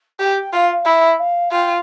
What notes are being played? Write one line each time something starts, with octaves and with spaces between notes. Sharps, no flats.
G4 G5
F4 F5
E4 E5
F5
F4 G5